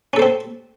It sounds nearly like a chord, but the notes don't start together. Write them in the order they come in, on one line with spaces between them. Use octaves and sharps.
C#4 A4 C5 C4